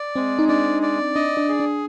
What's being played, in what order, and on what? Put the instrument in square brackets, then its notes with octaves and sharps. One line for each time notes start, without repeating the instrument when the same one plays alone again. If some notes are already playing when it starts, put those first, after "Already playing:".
Already playing: [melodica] D5
[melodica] G#3 [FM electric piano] C4
[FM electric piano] D#4
[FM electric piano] D4 [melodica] D5
[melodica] D5
[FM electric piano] D4 [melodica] D#5
[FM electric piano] D4
[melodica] G#4
[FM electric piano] D4